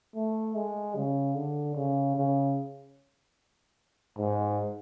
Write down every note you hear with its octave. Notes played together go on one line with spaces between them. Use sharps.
A3
G#3
C#3
D3
C#3
C#3
G#2